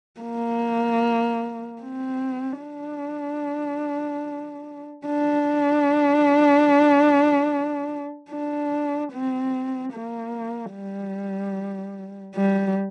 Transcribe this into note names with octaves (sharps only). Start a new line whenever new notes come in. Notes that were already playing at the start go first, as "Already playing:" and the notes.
A#3
C4
D4
D4
D4
C4
A#3
G3
G3